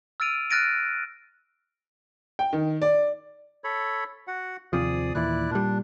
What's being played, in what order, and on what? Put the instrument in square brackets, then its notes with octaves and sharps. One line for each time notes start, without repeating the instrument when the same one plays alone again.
[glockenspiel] E6 F6 A6 D7 D#7 F7
F6 F#6 A6 A#6 D7 D#7
[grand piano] G5
D#3
D5
[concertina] A4 C#5 B5
F#4 F#5
[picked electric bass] D#2 C3 F3 [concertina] G#4 D5 D#6
[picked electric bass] D#2 A#2 E3 [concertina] E4 D5 F#6
[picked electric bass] A#2 G3 [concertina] D4